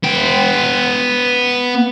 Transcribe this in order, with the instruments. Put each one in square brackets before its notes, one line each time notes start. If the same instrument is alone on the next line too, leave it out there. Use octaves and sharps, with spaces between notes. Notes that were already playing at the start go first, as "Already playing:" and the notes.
[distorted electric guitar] B3 G5